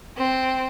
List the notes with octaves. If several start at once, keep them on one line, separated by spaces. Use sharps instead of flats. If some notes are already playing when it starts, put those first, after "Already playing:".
C4